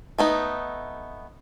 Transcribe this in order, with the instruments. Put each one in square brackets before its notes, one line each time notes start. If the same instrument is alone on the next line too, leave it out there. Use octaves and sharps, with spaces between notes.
[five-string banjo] A3 B3 D#4